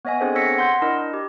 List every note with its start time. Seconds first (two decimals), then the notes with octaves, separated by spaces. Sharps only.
0.05 B3 C#5 D#5 E5 G#5
0.20 B3 C4 D4 G#4 A4 C5
0.35 C#5 E6 A#6 B6 C#7
0.57 F#5 C6 G6
0.82 D4 E4 A#4 D#5
1.13 G4